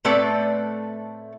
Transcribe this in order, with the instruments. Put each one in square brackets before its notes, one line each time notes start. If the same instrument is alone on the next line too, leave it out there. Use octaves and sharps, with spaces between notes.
[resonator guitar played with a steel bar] A2 A3 C4 A4 B4 D5